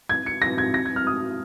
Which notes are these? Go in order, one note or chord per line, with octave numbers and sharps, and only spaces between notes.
G#6
C#7
A#6
G#6
A#6
G#6
F6
D#6